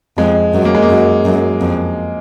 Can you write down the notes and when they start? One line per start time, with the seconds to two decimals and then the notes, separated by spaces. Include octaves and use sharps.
0.18 F2 G#3
0.54 F#2
0.65 A#3
0.75 G#3
0.82 A#3
0.89 F#2
1.25 F#2
1.61 F2